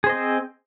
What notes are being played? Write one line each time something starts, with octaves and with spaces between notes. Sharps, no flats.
C4 G#4 C5 D#5